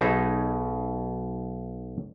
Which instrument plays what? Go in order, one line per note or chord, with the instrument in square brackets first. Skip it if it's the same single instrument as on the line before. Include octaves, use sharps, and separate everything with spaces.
[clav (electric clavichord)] B1 B2 D#4 G#4 E5